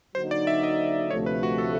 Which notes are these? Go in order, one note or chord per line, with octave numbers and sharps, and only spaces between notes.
D3 F#3 A#3 D#4 F#4 C5
D5
E5
D#5
D2 C3 F3 A3 C#5
B4
F#4
A4